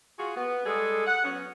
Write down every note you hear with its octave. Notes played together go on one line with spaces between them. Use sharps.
F4 F#4 G#4
B3
G3 G#3 G#4 A4
F#5
F#3 B3 C#4